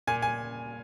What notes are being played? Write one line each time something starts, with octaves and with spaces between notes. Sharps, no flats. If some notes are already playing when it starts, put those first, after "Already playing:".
A#2 G#5
G#5